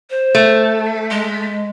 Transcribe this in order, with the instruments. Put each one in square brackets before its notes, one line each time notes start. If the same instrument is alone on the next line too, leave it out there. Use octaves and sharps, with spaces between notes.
[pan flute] C5
[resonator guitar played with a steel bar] A3
[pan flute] G#3